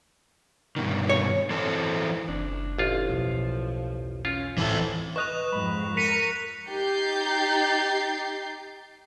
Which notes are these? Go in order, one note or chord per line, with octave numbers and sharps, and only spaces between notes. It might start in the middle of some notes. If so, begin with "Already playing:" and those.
G2 B2 D#3
C#5
E3 C4 A4
F#1 D4
A1 F4
B1 E2 F3
C#4 F4
D1 E3 C4 E4 A4
B4 D#5 C#6 D#6 F#6 F7
F2 G#2 B5
A#4 B6 C#7 D#7 F7
D#4 G4 A#5 G6 A6 C7